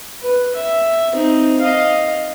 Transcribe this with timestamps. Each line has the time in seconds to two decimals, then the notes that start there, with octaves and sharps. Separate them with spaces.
0.22 B4
0.55 E5
1.12 C4 D#4
1.61 D#5 F5